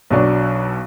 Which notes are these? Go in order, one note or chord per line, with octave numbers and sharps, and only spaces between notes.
B1 B2 F#3 D4